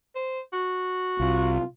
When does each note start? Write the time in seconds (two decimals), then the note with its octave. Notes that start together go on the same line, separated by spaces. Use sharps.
0.16 C5
0.53 F#4
1.20 C2 F4